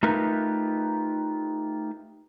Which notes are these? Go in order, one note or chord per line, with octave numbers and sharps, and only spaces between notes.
A3 D#4 F4 G4 A#4 B4